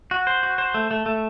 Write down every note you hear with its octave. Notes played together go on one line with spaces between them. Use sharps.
F#4
C5
F#4
C5
A3
A3
A3